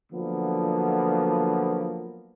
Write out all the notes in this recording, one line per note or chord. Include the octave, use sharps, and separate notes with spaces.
D3 F3 F#3 A#3 B3